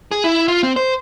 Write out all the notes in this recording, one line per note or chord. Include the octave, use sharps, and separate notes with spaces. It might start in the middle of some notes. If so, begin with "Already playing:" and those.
G#4
E4
F4
C4
C5